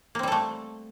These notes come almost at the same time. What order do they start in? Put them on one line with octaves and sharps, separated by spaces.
A#3 C4 G3 A4 A3